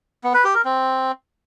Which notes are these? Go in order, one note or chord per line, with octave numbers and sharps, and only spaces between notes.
B3
B4
G4
A#4
C4